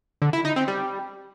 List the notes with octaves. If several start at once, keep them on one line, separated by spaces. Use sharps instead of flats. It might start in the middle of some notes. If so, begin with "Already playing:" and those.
D3
E4
D#4
C4
G3